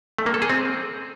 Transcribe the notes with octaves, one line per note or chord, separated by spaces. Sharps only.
A3
A#3
A4
G#4
C4